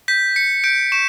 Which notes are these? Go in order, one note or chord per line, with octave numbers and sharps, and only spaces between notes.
G6 B6
G6 C#7
G6 D7
C#6 E7